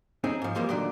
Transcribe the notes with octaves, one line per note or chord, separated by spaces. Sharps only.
C4 C#4 D#4 G#4
G#2 F3
E3 F3 G3 G#3 A#3
A#2 D3 D#3 F#3 D5